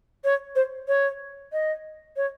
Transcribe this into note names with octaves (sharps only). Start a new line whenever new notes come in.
C#5
C5
C#5
D#5
C#5